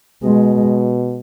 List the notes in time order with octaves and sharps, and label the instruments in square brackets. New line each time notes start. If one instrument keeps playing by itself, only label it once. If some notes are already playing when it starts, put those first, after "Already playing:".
[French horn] B2 [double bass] G#3